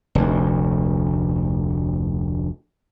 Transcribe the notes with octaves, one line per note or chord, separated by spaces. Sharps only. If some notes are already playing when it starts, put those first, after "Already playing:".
F1 D2